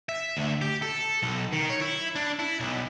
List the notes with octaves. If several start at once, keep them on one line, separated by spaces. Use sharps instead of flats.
E5
D2
G4
A4
B1
D#3
C#5
E4
D4
E4
B1